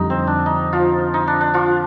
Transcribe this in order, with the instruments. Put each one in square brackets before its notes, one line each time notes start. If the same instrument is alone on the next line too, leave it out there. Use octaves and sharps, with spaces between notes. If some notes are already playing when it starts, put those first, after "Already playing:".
Already playing: [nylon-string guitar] F2 D3 G3 [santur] D#4
[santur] C4
D4
D#4
F3 F4
D#4
D4
D4
F3 F4